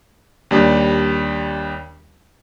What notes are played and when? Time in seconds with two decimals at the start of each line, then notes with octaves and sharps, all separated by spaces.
0.51 D#2 G3 D4